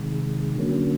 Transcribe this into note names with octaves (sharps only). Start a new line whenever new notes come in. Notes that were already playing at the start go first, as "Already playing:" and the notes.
Already playing: C3 D#3 G#3
D3 F#3 A#3 C#4